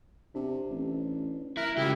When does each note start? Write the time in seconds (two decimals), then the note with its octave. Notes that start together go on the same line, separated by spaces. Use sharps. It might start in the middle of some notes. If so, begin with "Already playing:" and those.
0.35 C3 D4
0.70 A1
1.57 E4 A#4 F#6
1.77 F#2 C#3 G#3 E4 F4 G4